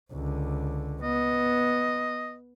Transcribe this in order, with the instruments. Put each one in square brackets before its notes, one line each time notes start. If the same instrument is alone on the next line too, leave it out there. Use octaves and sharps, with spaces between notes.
[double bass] C#2 D3
[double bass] B3 [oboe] D#5